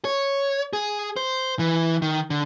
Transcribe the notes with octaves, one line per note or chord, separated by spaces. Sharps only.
C#5
G#4
C5
E3
D#3
D3